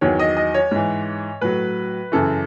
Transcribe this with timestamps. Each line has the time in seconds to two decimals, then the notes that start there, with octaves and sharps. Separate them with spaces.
0.01 E2 D#3 F#3 C#5
0.19 D#5
0.37 D#5
0.54 C#5
0.71 G#2 E3
1.41 A2 F#3 B4
2.12 F#2 C#3 E3 A4